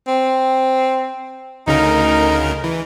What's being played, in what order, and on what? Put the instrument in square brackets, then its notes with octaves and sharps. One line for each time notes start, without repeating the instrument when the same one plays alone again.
[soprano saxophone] C4
[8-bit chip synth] D2 C#3 A#4 [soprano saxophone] D#4
[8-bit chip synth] E3